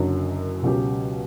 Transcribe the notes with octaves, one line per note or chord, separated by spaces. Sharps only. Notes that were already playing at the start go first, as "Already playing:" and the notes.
Already playing: F#1 F#2 D3 F#3
C#2 B2 F#3 C#4 G4